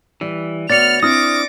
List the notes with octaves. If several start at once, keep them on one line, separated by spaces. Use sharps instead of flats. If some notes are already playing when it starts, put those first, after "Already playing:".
E3 G3
D2 B3 C#5 D5 F6 A6 C#7 F7
C4 D4 E4 D6 D#6 F6 A#6